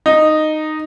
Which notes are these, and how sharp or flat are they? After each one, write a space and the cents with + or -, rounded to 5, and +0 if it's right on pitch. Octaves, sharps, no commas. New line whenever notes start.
D#4 -10